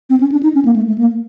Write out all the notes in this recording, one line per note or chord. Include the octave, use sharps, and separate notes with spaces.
C4
C#4
D4
D#4
C#4
A#3
A3
A3
A#3